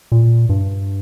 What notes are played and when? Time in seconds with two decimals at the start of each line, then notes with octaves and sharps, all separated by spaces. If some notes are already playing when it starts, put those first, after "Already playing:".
0.12 A#2
0.49 G2